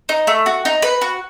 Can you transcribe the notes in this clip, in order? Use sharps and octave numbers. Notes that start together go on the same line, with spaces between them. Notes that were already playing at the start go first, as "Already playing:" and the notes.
D#4
A3
F#4
D#4
B4
F#4